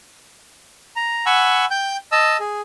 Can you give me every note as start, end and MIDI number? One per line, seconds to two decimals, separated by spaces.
0.96 1.25 82
1.26 1.65 78
1.26 1.65 80
1.26 1.65 83
1.26 1.65 85
1.26 1.65 88
1.71 1.97 79
1.71 1.97 91
2.12 2.37 75
2.12 2.37 81
2.12 2.37 88
2.40 2.61 68